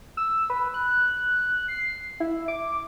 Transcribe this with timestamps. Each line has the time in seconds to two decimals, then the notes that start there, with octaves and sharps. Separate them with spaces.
0.17 E6
0.50 B4
0.74 F#6
1.68 C7
2.20 E4
2.48 D6